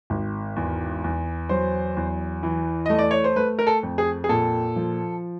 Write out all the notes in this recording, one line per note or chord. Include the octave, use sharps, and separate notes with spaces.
G#1
E2
E2
F#3 C5
E2
E3
A3 D#5
D5
C#5
C5
A3 B4
A#4
A4
F2
G#4
G#4
A#2 A4
F3